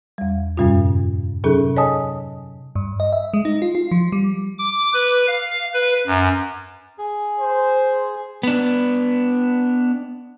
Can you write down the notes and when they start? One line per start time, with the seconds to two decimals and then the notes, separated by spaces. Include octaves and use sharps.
0.18 E2 G3
0.57 F#2 A2 C3 G3 C#4 F4
1.44 C3 F#3 C#4 D#4 G#4 A4
1.77 C#5 D#5 G#5 A5 D#6
2.76 G2
3.00 D#5
3.12 E5
3.33 G#3
3.45 D#4
3.62 F4
3.75 F4
3.91 F3
4.12 G3
4.59 D6
4.94 B4
5.28 F5
5.74 B4
6.07 F#2
6.98 G#4
7.40 C5
8.43 B3 D4